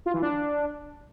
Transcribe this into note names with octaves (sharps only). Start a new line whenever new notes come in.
F4
E3
D4